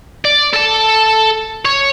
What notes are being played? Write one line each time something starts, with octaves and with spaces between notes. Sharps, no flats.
D5
A4 A5
C#5